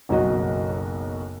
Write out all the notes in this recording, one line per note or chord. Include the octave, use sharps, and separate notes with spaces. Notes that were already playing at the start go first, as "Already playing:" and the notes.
F#1 B1 F#3 F#4 D#5